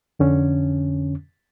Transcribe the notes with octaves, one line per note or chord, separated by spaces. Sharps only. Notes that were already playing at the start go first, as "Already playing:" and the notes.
F2 D3 C#4